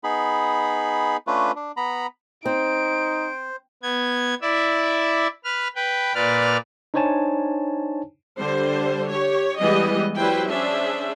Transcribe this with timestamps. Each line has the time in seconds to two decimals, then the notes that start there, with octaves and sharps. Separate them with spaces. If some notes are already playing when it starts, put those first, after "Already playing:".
0.04 B3 D#4 G#4 B5
1.27 A3 C#4 D4 F4 B4
1.56 D4
1.77 B3 A#5 B5
2.45 C4 D#4 C5 D7
3.83 B3 G#6
4.42 E4 D5 E5
5.45 B4 F6
5.76 B4 G5
6.15 A#2 B4 D5 F6
6.94 D4 D#4 C5 C#5 G#5 A5
8.40 D3 G3 C5
9.10 G4 C#5
9.60 E3 G3 G#3 B3 G4 D#5
10.17 F#3 G3 E4 B4 C5 G5
10.49 C#4 D4 G#4 C5 E5